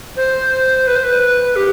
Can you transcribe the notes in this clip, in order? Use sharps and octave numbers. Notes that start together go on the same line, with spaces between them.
C5
B4
C5
B4
G4